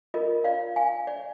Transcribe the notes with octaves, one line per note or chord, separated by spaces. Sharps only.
F4 A#4 D#5
D5 F5
F5 G#5
D5